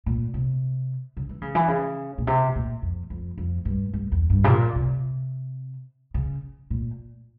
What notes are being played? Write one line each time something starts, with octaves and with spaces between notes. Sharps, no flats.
A#2
C3
C#3
E3
C#3
E3
C#3
A#2
C3
A#2
F2
F2
F2
G2
G2
E2
G2
C3
A#2
C3
C#3
A#2